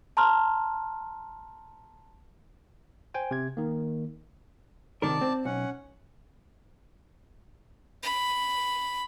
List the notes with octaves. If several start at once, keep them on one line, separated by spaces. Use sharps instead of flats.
A5 A#5 C6 F6
C5 G5 G#5
C3 G#6
D#3 A#3
C3 D#3 A#4 D5 A5
C4
B1 C#4 F#5
B5